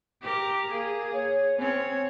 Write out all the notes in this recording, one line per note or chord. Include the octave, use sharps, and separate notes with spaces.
G4 A#4
A#3 G#4
C#5
C4 C#4 C#5